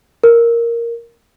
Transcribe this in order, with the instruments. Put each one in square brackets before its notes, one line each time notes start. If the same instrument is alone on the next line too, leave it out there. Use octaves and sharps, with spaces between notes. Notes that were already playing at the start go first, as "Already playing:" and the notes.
[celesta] A#4